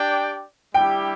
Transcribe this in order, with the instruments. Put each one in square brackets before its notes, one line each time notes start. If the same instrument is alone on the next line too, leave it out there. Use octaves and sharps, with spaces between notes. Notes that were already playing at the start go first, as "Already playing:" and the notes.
Already playing: [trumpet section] D4 G4 D5 G5
[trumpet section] G3 E4 G4 [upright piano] G5